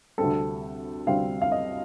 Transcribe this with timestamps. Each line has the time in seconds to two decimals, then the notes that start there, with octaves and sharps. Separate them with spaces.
0.18 D2 C3 G3 C4 A4
1.07 D2 C3 G3 C4 F5
1.41 F5
1.52 D#5